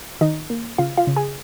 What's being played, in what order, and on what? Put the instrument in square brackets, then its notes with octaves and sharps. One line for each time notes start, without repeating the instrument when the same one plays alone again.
[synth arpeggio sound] D#3 D#4 D#5
A#3
C#3 F4 F5
F4 F5
C#3
G#4 G#5